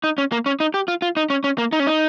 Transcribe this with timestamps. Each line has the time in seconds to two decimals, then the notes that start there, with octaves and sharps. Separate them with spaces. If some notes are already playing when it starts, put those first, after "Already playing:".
0.04 D#4
0.18 C#4
0.32 A#3
0.46 C#4
0.60 D#4
0.74 G4
0.88 F4
1.02 F4
1.17 D#4
1.30 C#4
1.44 C#4
1.58 A#3
1.72 D#4
1.80 C#4
1.87 D#4